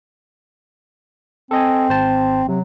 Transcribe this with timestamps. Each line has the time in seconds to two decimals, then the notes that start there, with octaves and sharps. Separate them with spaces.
1.51 C4 A4 D#5 G#5
1.89 G#1 C5 A5
2.48 C3 F#3